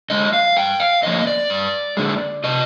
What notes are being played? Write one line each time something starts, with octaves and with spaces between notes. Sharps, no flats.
D3 G#3 D#5
F5
G2 G5
F5
D3 F3 A#3 D#5
D5
G2
D3 G#3
C3 D#5